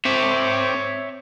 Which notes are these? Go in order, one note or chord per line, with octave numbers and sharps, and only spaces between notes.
C4 C#5 E5 D6